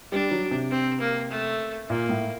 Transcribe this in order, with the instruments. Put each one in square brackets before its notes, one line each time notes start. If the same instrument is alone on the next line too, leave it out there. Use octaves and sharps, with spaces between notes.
[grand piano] G3 [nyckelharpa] D4
[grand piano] F#3
C3
[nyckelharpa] C4
A#3
A3
[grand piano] A#2 [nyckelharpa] A#3
[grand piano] A2